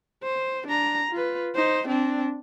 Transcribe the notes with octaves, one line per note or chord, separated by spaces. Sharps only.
C5
D4 A#5
F4 B4
D#4 C5
C4 D4